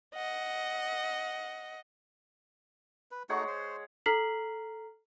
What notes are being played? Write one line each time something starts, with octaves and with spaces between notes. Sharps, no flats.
D#5 F#5
B4
G#3 A3 D#4 F#4 C#5 F#5
C5 C6
A4 A#5 F6 B6 C7 F#7